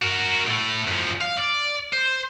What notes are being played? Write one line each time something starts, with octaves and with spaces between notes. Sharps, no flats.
F#4 A#4
A2 A3
F#2 F3
F5
D5
C5